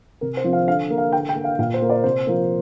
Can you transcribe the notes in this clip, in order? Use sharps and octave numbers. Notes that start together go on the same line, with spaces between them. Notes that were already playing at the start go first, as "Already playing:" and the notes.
C3 A#4
C5
F3 C4
F5
D3 F5
A#3
F5
D3 G5
G5
A#3
F5
A#2 F5
C5
A#3
D5
C3 C5
F3 A#3